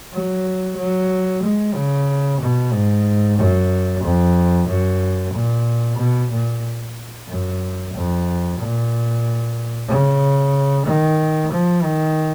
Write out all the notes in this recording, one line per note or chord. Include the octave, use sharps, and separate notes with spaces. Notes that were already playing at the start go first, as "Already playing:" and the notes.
F#3
F#3
G#3
C#3
B2
G#2
F#2
F2
F#2
A#2
B2
A#2
F#2
F2
A#2
C#3
D#3
F3
D#3